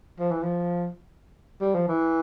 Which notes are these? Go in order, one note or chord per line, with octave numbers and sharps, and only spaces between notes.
F3
E3
F3
G3
F3
E3